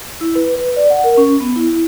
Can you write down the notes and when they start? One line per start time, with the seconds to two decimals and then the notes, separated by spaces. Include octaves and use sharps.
0.21 E4
0.35 B4
0.56 B4
0.76 D5
0.90 F#5
1.04 A#4
1.17 C#4
1.41 B3
1.56 E4